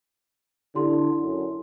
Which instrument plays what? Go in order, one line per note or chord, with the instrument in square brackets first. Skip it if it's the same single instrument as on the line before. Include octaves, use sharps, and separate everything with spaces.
[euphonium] D3 [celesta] E4 G4 C6
[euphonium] F#2